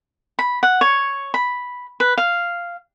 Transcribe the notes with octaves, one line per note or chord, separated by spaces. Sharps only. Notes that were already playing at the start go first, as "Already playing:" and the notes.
B5
F#5
C#5
B5
B4
F5